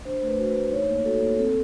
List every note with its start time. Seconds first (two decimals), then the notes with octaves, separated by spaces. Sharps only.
0.05 D4 C5
0.22 A3
0.27 B4
0.39 F#4
0.50 A3 B4
0.71 D#4 C#5
0.89 A#3
1.05 F#4 A4
1.23 A#3
1.39 C4 A4